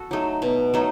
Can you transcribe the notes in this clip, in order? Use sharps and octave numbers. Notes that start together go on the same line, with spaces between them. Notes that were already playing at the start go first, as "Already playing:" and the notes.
Already playing: F#4 A4
F#3 A3 D#4
B2
F#3 A3 D#4